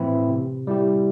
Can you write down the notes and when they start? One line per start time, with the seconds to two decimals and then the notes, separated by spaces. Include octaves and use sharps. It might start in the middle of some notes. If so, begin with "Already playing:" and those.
Already playing: A2 E3 C4 E4
0.29 C3
0.67 G3 E4 G4